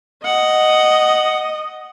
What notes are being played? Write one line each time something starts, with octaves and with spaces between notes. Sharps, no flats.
D#5 F#5